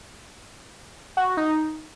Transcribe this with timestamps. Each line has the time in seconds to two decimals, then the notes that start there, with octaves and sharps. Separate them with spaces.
1.17 F#4
1.27 F#4
1.37 D#4